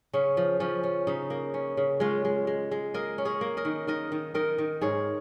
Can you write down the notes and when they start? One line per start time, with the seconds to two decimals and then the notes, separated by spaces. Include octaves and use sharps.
0.13 C#3 C#4
0.37 F3
0.60 F3 C#4
0.83 C#4
1.07 C#3 D#4
1.30 A#3
1.54 C#4
1.77 C#3
2.00 G#3 C#4 F4
2.25 G#3
2.47 G#3
2.71 G#3
2.94 A#3 A#4 D#5
3.18 C#4
3.25 G#4 C#5
3.41 A#3
3.57 A#4 D#5
3.65 D#3
3.87 D#3 A#4 D#5
4.12 D#3
4.34 D#3 A#4 D#5
4.58 D#3
4.81 G#2 G#4 C#5